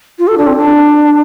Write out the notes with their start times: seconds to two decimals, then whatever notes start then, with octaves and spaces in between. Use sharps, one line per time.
0.19 F4
0.28 A4
0.38 D4
0.47 C4
0.57 D4